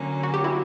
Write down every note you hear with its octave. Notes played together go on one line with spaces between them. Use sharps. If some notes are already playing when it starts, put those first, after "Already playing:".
Already playing: D3 F#3 A#3 C#4
F#4
G4
E4 F#4